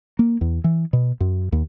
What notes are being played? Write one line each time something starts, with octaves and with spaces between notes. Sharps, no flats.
A#3
E2
E3
B2
F#2
D#2